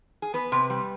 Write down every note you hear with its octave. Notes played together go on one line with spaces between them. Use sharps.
G#4
B3 B4
C3
G3